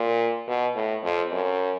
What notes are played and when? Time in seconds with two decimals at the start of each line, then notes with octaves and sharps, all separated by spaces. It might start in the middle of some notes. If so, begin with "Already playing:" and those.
Already playing: A#2
0.48 B2
0.75 A2
1.04 F2
1.32 F#2